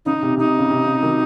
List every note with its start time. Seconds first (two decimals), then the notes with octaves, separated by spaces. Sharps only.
0.05 C#3 D#4
0.23 C3
0.37 C3 D#4
0.59 C#3
0.70 C3
0.86 C#3
1.03 D#3 F#3